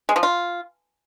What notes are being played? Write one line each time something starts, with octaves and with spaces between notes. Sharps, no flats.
G#3
F3
F4